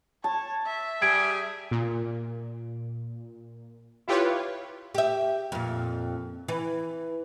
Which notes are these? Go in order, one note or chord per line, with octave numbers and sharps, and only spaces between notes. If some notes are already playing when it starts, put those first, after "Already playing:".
C#5 A5
E5
G3 G#4 G#6 D7
A#2
E4 F4 G4 B4 C#5
G4 E5
F2 A#2
E3